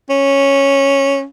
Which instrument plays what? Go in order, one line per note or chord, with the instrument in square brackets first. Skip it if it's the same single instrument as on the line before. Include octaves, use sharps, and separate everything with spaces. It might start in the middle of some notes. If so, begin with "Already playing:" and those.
[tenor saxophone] C#4